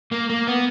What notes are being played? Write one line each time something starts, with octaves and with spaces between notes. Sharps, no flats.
A#3
A#3
B3